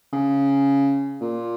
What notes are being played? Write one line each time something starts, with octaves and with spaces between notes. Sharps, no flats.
C#3
A#2